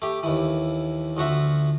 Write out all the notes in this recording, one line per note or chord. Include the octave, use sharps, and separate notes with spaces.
A3 G4
D#2 E3
D2 F3 F#4 E5